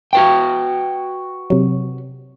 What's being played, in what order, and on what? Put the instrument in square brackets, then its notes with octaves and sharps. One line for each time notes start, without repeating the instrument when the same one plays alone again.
[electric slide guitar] F#4 B4 G5
[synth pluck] C3 F#3